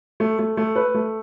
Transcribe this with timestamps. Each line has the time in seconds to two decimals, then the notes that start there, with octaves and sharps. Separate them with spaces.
0.20 A3
0.39 A3
0.57 A3
0.76 B4
0.94 A3